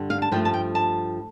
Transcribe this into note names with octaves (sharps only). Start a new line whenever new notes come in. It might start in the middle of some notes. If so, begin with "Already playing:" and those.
Already playing: G2 D3 G3
F5
A5
G2 F3 A3 G5
A5
G5
A5